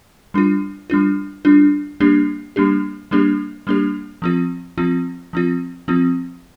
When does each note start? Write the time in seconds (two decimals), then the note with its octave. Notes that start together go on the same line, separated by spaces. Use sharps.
0.34 G3 D4 F4
0.90 G3 D4 F4
1.45 G3 D4 F4
2.00 G3 A#3 D4 G4
2.56 G3 A#3 D4 G4
3.11 G3 A#3 D4 G4
3.67 G3 A#3 D4 G4
4.22 F3 C4 F4
4.78 F3 C4 F4
5.33 F3 C4 F4
5.88 F3 C4 F4